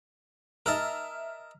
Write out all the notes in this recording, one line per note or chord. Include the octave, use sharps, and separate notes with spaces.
A#4 D#5 E5 A5 E6 F6